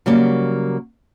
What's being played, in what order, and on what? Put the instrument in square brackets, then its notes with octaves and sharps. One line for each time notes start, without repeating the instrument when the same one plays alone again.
[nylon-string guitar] C#3 F#3 G3 A#3